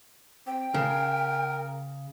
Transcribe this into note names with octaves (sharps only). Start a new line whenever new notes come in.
C4 G5
C#3 A#4